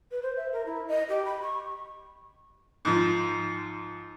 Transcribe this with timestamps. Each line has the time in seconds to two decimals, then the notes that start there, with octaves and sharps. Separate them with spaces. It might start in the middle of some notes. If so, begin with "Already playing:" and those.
0.11 B4
0.23 C5
0.37 E5
0.52 A#4
0.66 E4
0.88 D#5
1.09 G4
1.25 B5
1.42 C#6
2.85 G#2 F3